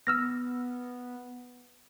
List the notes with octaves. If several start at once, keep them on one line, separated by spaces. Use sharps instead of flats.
B3 E6 F6 A#6